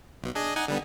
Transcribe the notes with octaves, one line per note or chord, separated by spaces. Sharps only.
B1 B2
D4 G#4 D#5
D#4 F#5 G#5
D3 G3 B3